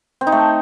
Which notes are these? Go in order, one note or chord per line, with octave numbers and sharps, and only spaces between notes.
C4
D#4
A3